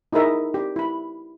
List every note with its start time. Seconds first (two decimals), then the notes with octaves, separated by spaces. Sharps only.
0.13 D#4 E4 G#4 A#4 E5 D#6
0.54 G4
0.76 E4 B5